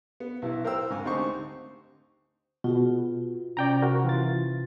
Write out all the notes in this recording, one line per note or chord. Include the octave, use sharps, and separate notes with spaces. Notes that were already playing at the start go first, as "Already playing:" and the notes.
B3
B1 E3 E4
A#4 C5 G5 E6
F2 G#2 G#5
D2 C4 D#4 G4 C5 C#6
B2 F4 F#4 G#4
C3 C#4 D5 G5 A#5
F#4 A#4
E3 F4 A6